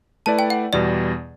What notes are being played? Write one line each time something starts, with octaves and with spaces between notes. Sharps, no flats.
A3 E4 B4 D5 A5
G5
F#5
E2 B2 G3 B3 D5